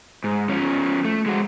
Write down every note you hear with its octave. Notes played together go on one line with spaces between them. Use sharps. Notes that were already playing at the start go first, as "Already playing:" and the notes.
G#2
F3 C#4
A3
G#3 F#4